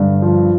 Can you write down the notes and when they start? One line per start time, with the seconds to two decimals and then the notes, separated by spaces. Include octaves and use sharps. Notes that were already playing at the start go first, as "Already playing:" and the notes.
Already playing: G2 D3
0.22 F3